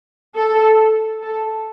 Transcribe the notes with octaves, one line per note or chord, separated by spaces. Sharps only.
A4
A4